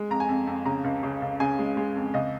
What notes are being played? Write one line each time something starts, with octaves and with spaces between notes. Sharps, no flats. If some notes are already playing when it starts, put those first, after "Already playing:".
Already playing: G#3
F2 A#5
G#5
F2
F2
C#3 A#5
C#2
C#3
C#2
C#3 G#5
G#3
G#3
F2
C#2 D#5